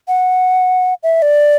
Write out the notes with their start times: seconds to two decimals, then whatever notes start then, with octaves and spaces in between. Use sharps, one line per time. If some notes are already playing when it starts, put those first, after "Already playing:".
0.08 F#5
1.03 E5
1.22 D5